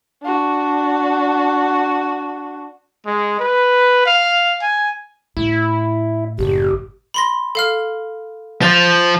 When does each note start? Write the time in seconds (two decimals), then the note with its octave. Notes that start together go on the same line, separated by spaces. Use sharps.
0.23 D4 F#4
3.06 G#3
3.40 B4
4.06 F5
4.62 G#5
5.37 A2 E4
6.39 F#1 G4
7.14 B5 C6 A#6
7.55 A4 F5 F6
8.62 F3 F4 A6